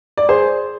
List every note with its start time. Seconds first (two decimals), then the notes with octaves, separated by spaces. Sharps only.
0.17 D5
0.29 G#4 C5